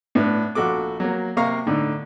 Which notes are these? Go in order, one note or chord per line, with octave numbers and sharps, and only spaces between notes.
A2 B3 D4
A#1 F#4 A4 D6
F#3 A#3
C3 A#3 F5 A#5 C#6
A2 D3 D#4